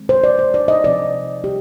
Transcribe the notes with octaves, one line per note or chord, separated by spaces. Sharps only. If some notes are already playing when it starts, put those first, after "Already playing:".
Already playing: D#3 G#3 C4
C5
D5
C5
D5
D#5
C3 F3 C4 D5
G4